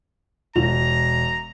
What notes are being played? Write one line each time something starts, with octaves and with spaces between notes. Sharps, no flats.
E1 A#5 F7